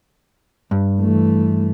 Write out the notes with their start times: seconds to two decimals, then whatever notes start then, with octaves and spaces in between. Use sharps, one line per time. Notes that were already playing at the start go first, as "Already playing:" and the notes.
0.71 G2
1.00 E3 A3